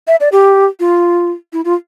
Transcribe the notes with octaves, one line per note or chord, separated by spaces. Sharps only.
E5
D5
G4
F4
E4
F4